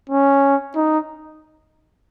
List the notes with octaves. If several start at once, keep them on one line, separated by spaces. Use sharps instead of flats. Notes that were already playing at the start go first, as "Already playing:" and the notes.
C#4
D#4